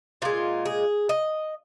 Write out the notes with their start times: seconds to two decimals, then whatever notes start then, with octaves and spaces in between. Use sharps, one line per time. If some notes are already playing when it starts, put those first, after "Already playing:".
0.22 A#2 G#3 F4
0.66 G#4
1.09 D#5